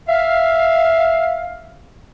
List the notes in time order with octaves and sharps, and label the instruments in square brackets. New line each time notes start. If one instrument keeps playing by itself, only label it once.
[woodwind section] E5 F5